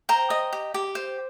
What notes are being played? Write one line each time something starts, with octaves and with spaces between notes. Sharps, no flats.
C5 G5 A#5
D#5
G4
G4
C5